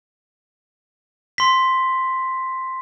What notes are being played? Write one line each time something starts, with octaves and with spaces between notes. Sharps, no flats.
C6 B6